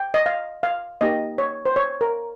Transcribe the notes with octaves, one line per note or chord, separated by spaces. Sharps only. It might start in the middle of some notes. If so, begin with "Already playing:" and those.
Already playing: G5
D#5
F5
F5
A#3 D#4 G4 D#5
C#5
C5
C#5
A#4